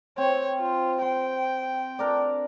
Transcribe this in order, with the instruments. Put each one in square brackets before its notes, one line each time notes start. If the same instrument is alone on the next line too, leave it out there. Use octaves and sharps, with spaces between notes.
[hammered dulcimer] C4 [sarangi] C#5
[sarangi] F4
[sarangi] G5 [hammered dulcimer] C6
[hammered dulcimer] D4 A#4 D5